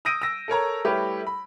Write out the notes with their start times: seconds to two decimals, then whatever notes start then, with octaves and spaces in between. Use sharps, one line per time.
0.05 D#6 E6 G6 A#6 D7 D#7
0.22 E6 A#6
0.48 A4 A#4 C#5 A#5
0.85 G3 A3 E4 G4 B4 C#5
1.27 B5